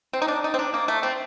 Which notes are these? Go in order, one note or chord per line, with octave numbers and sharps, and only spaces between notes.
C4
D#4
D4
D#4
C4
D4
A#3
A3
C4